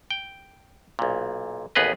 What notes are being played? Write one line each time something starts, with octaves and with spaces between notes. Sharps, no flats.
G5
B1 A#2
A1 D#2 B3 G#4 B4 D#5